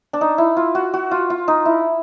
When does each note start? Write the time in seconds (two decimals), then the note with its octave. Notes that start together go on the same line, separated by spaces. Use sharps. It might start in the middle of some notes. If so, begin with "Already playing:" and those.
0.13 D4
0.21 D#4
0.38 E4
0.57 F4
0.75 F#4
0.94 F#4
1.11 F4
1.30 F4
1.48 D#4
1.66 E4